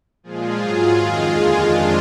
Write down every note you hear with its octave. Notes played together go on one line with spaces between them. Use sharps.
A#2 F3 G#3 F4 G#4
G#2 F#3
F2 D#3 G#3 F4 G#4
D#2 D3 F3 G#3
F2 D#3 G#3 D4 F4